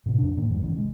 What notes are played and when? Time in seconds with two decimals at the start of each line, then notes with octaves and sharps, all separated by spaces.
0.06 A2 C3
0.18 F2 D4
0.37 A2 D#3 A#3
0.50 F2 G#2
0.62 A#1 C#3 E3
0.78 G#3